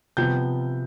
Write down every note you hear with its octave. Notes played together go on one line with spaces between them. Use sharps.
C3 F3 B3 G6